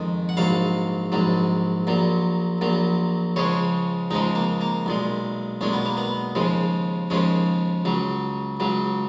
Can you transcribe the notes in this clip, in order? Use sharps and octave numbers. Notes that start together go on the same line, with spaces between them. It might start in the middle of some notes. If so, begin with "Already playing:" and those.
Already playing: F2 D#3 G#3
F#5
A#1 G#2 F#3 F5
A#1 G#2 F#3
A#1 A#2 F#3
A#1 A#2 F#3
C#2 C#3 F3 G#3 C#5
C#2 C#3 F3 G#3 D#4
A#3
A#3
B1 A#2 G#3
B1 A#2 G#3 C#4
B3
A#3
B3
D#2 C#3 F3 G#3
D#2 C#3 F3 G#3 C#4
C#2 C#3 F#3
C#2 C#3 F#3